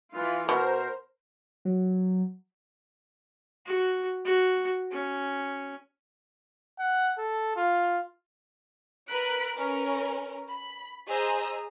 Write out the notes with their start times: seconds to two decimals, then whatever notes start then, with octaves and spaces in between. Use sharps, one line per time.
0.14 E3 F4
0.49 B2 A#4 C5
1.65 F#3
3.66 F#4
4.25 F#4
4.91 C#4
6.79 F#5
7.18 A4
7.57 F4
9.09 A#4 B4 B5 F#6 B6 D7
9.55 C#4 A#4 B4
10.49 B5
11.08 G#4 C5 D#5 A#5 D#6 E6